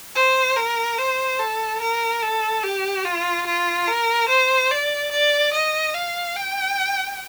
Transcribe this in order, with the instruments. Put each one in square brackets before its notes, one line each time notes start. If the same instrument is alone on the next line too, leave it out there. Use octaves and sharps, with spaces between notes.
[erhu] C5
A#4
C5
A4
A#4
A4
G4
F4
F4
A#4
C5
D5
D5
D#5
F5
G5